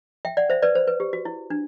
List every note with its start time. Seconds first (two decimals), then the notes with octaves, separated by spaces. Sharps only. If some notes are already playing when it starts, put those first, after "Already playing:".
0.25 E5 G5
0.37 D5 F#5
0.50 C5 E5
0.62 B4 D5
0.75 C5
0.87 B4
1.00 G4
1.13 F#4
1.25 E4
1.50 D4